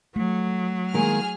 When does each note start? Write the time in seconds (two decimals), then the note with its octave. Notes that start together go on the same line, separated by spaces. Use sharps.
0.16 F#3 A3
0.94 D#3 G#3 A#3 G#4 F6